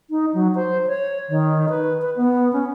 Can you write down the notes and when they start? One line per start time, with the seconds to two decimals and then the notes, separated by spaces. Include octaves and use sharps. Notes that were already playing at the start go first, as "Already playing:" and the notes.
0.10 D#4
0.34 F#3
0.55 C5
0.87 C#5
1.29 D#3
1.69 B4
2.02 B4
2.16 B3
2.53 C#4